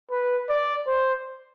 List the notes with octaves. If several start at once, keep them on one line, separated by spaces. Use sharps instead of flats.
B4
D5
C5